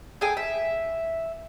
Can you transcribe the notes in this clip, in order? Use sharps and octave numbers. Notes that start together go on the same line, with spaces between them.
G#4 A4 G5 G#5
E5